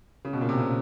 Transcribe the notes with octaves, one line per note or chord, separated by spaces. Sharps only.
C#3
B2
A#2
C3
C#3